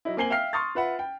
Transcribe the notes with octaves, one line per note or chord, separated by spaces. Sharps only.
F#3 D#4 E4
A#3 C4 G#5 C7 F#7 G7
E5 F5 G5 F6 C7
C6 C#6 D#6 F6 A6
F4 B4 E5 F#5
G5